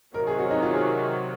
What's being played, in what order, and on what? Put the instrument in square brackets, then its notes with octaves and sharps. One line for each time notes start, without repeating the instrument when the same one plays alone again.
[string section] C3 D#3 F#3 [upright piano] A#4
[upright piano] G#4
F#4
D#4
F4
G#4